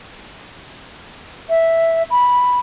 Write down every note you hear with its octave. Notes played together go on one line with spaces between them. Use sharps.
E5
B5